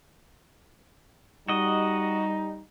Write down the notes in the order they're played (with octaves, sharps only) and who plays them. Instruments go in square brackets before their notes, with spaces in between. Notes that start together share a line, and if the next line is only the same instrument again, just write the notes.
[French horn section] G3 [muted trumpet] D#4 [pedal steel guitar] F#4 D#5